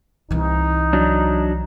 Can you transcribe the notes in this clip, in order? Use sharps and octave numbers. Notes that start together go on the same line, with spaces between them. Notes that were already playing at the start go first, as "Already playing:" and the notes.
C2 E3 D#4
F#3 D4